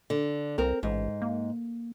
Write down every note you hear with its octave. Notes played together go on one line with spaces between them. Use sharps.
D3
C2 C4 A#4
A1 G#2
A#3